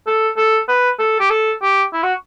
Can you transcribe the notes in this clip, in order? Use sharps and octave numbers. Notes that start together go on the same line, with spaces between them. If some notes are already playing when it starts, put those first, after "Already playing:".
A4
A4
B4
A4
G4
A4
G4
E4
F#4